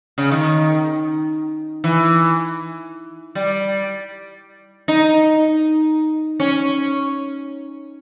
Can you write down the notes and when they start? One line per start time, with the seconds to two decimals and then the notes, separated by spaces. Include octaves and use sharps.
0.18 C#3
0.31 D#3
1.84 E3
3.35 G3
4.88 D#4
6.40 C#4